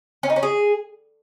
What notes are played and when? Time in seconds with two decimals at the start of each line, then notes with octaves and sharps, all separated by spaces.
0.23 C#4
0.30 D#4
0.36 C#4
0.43 G#4